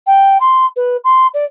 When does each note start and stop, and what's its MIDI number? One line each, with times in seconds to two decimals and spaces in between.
0.07 0.38 79
0.41 0.66 84
0.76 0.97 71
1.04 1.27 84
1.34 1.45 74